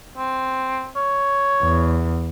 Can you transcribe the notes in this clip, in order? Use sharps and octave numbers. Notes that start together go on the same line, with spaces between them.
C4
C#5
E2